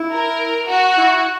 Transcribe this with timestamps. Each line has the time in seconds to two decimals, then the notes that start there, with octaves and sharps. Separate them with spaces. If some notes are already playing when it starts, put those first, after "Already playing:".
Already playing: E4
0.12 A#4
0.69 F#4
0.97 E4